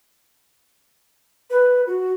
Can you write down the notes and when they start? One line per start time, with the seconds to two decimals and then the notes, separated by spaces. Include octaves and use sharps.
1.50 B4
1.87 F#4